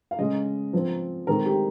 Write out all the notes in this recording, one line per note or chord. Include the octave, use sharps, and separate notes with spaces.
F5
C#3 G#3 C#4 D#5
F3 C4
D#3 G#3 C4 A#4
G4